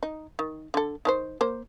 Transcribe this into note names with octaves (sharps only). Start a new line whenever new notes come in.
D#4
D#3
D3 A4
D#3 D4 C5
A#3 C5